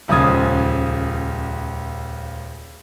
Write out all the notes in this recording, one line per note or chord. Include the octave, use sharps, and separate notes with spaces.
D#1 C#2 F3 D#6 G#6